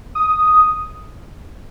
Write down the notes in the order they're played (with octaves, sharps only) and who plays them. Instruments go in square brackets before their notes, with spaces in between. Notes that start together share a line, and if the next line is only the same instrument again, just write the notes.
[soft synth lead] D#6